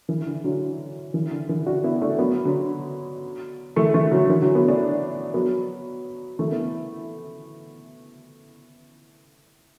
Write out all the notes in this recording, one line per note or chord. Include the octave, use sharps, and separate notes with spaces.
E3
D3
D3 F#3
E3
D3
E3
D4 F#4
B3 E4
A3 D4
F#3 B3
D3 F#3
E3 A3
E3 A3
D3 F#3
E3
D3 F#3
F#3 B3
A3 D4
F#3 B3
E3 A3
B3 E4